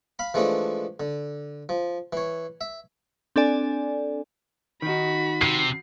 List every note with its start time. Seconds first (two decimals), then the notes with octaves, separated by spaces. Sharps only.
0.19 F5 B5
0.34 E3 F3 G#3 A3 D4
1.00 D3
1.69 F3
2.13 E3 C#5
2.61 E5
3.36 C4 D4 A4 D5 G#5
4.82 D#3 D#4 F#4 B5
5.41 C3 C7